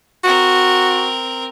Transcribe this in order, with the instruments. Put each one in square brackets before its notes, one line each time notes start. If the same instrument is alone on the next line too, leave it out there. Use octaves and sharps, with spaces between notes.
[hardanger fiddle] C4 A#4 [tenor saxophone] F#4